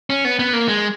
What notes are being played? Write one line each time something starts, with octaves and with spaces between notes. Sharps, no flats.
C#4
B3
B3
A#3
G#3